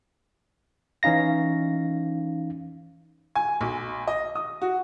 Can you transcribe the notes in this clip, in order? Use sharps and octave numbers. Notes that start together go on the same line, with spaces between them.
E3 C#4 D#4 F5 A#6
G#5
B1
D#5
D#6
F#4